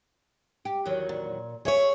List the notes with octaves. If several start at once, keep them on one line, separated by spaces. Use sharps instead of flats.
G4
E2 D#3 F#3
A#2
C#4 G#4 C#5 E5